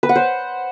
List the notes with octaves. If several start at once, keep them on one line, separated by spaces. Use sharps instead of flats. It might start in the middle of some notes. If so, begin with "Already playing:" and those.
B4
F#5
C5